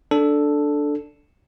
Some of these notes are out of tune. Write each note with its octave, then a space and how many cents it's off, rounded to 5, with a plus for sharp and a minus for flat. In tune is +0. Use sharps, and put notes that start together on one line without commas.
D4 +0 A4 +0